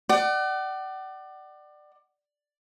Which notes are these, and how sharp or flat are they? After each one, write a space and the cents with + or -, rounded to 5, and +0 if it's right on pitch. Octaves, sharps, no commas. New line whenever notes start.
D5 +25 F#5 +40